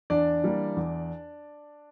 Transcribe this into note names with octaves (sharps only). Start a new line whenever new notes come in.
E2 D4 D5
E3 G3 A#3
E2